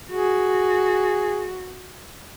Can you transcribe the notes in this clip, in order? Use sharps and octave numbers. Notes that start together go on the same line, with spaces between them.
F#4 G#4